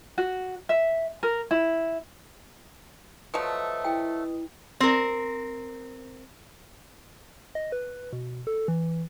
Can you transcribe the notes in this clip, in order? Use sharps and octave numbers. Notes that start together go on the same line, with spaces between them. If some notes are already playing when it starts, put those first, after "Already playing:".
F#4
E5
A#4
E4
F3 F#3 A3 B4 D#5 D#6
E4 G5
C4 A#4
D#5
B4
B2
A4
E3